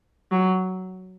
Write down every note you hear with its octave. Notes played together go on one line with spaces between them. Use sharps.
F#3